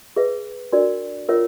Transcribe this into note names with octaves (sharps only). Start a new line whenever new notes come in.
G#4 B4 E5
D4 F#4 A#4 D5
C#4 F4 A#4 C#5 E5